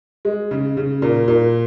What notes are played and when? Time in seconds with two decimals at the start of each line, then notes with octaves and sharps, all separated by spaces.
0.25 G#3
0.51 C#3
0.77 C#3
1.02 A#2
1.28 A#2